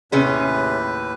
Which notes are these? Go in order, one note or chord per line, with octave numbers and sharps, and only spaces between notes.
D#2 A2 C3 C#4 G#4 B4